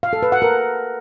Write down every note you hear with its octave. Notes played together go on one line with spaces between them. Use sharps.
F5
A4
B4
F#5
A#4